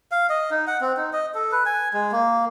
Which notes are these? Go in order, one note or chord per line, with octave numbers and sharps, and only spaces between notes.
F5
D#5
D#4
F#5
C4
D#4
D#5
A4
B4
G#5
G#3
A#3